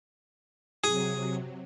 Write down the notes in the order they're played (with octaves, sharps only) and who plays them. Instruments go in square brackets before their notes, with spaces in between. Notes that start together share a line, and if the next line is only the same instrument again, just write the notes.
[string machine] C3 F#3 [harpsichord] G#4